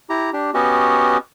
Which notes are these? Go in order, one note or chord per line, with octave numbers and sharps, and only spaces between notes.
E4 G4 A#5
D4 G4
B3 C#4 F#4 G4 D#5